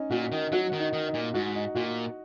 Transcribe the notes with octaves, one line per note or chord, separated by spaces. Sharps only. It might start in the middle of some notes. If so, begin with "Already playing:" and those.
Already playing: C#4 D#4
A#2 F#4
D#3 D#4
F#3 F#4
D#3
D#4
D#3
D#4
A#2
G#2 F#4
D#4
A#2 F#4